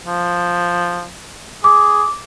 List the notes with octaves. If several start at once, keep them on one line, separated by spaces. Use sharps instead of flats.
F3
G#4 D6